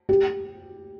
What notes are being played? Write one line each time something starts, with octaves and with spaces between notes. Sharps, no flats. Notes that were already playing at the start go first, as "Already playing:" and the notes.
G4